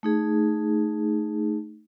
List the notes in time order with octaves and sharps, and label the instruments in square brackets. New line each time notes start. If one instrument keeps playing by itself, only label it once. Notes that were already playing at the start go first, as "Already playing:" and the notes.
[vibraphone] A3 D#4 G#4